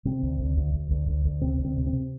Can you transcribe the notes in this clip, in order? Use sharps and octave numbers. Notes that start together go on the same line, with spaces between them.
C3 C4
D2
D2
D2
D2
D2
D2
D2
C3 C4
D2
C4
C3
C4
C3